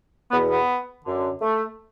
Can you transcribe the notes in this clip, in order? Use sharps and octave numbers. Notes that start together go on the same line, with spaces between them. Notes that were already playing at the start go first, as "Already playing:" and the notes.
E2 B2 B3
B3
F#2 D3
A3